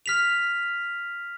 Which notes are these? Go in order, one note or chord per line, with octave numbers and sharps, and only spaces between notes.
F6 B6 F7